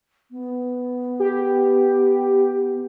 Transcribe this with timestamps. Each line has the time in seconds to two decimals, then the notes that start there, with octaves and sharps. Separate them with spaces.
0.31 B3
1.20 G4